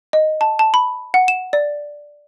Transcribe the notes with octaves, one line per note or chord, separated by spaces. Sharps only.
D#5
A5
A5
B5
F#5
E7
D5